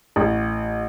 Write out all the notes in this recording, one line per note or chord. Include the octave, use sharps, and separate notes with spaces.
A1